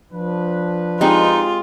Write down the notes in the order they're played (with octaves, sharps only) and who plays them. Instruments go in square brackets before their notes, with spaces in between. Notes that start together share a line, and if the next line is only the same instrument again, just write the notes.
[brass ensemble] F3 D4 B4
[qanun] G#3 C4 G4 [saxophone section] D#4 [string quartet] F4